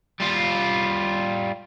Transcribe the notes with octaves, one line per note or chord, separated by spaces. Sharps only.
G3 F4